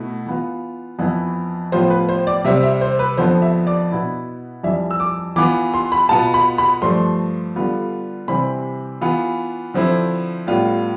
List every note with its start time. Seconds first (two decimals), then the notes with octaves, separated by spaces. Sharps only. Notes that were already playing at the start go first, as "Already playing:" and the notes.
Already playing: B2 A3 E4
0.26 E3 B3 F4
0.99 F2 E3 B3 E4
1.72 A2 F3 B3 F4 C5
1.90 B4
2.09 C5
2.27 D5
2.45 C3 G3 C4 E5
2.63 E5
2.81 C5
2.99 B4
3.17 F2 D3 F3 B3 C5
3.42 E5
3.67 D5
3.91 B2 B3 E4
4.63 F2 E3 G3 D4 E5
4.91 E6
5.00 D6
5.36 E3 B3 F4 D6
5.74 C6
5.92 B5
6.09 B2 B3 F4 A5
6.34 B5
6.58 B5
6.82 G2 F3 A3 D4 C6
7.56 D3 G3 B3 F4
8.28 C3 E3 G3 C4 B5
9.01 E3 B3 F4
9.74 D3 F3 C4 E4
10.47 A2 G3 B3 F4